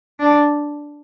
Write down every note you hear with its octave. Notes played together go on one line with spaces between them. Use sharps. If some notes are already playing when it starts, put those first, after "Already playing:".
D4